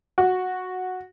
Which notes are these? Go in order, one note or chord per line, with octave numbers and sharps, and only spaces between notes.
F#4